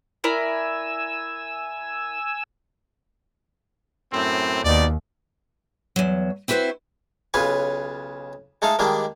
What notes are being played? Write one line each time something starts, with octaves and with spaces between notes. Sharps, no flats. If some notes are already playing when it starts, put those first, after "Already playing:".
E4 A#4 D5 G#5 E6
F#2 A2 C4
D#2 B2 D#3 D5
E2 F#3
C4 E4 F#4 A4 B4 C5
B1 C#3 F4 B4 G#5
G#3 A3 D#4 A4 F5
D#3 G3 G#3 A#3 D4